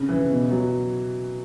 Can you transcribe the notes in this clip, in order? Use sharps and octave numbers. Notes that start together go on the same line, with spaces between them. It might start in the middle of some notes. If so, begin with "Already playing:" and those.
Already playing: C#3
E3
B2
F#3